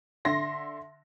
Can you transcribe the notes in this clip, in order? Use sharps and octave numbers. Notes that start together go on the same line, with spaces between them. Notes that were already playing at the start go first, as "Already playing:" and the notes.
D3 E5 C6 A#6